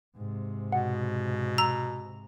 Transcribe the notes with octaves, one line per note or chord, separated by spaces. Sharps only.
G#2 C3
B2 F#5
A#5 E6